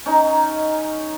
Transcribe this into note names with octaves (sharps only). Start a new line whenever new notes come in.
C#4 D#4